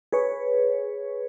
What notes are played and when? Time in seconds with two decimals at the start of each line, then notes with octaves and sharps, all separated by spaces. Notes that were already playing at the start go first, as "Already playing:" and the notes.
0.12 G#4 B4 C#5